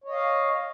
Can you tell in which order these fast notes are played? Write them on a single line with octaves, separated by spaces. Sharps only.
C#5 D#5 F5